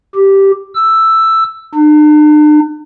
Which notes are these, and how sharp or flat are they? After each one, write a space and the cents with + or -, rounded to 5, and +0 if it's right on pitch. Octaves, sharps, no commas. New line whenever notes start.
G4 -5
E6 +5
D4 +45